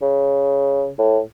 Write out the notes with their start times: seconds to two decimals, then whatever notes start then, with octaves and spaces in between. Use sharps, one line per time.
0.02 C#3
0.99 A2